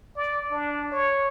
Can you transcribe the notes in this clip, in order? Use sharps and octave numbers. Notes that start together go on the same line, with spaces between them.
D5
D4
C#5